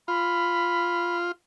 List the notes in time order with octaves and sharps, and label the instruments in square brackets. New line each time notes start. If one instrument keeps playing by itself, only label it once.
[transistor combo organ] F4 [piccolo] B5